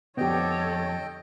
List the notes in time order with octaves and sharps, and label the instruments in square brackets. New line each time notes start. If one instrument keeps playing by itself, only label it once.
[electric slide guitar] F2 D3 [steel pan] B3 G4 [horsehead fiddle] A4 C#5 [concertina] D#5 G5